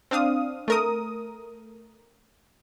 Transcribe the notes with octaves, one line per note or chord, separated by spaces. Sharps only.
C4 D4 F5 D#6
A3 A#4 D#6